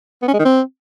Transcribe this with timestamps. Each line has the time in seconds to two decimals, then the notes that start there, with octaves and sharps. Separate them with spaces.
0.22 B3
0.28 C#4
0.34 G#3
0.39 D#3
0.45 C4